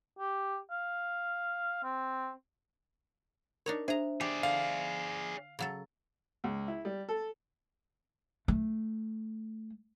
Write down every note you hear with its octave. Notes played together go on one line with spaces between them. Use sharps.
G4
F5
C4
D4 D#4 A#4 C#5
D4 G#4 C5 E5 A#5
G4 G#4 D5
D3 F5
C#3 F#3 A4
C#2
E4
G3
A4
A3